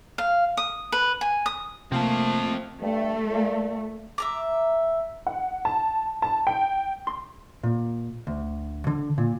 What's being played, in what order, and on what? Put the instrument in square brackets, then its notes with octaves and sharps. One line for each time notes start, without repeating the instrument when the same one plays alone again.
[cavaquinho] F5
D#6
B4
G#5
D#6
[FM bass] C3 [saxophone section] F3 [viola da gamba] A3 A#3 [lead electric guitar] C4 A5
[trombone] G2 [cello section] A3
[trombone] A#2
[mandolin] E5 A#5 D6
[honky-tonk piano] F#5
A5
A5
G5
[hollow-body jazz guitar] C6
A#2
D2
D3
A#2